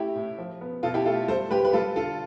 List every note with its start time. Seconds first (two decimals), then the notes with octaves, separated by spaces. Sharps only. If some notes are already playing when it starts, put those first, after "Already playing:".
Already playing: A3 E4 G4
0.15 A2
0.38 F3
0.61 B3
0.83 B2 F4 A4
0.94 E4 G4
1.05 A3 F4 A4
1.28 G3 A4 C5
1.51 G3 G4 B4
1.65 B4
1.73 G3 F4 A4
1.96 D3 F4 A4